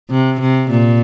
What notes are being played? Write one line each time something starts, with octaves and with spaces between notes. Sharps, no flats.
C3
C3
A#2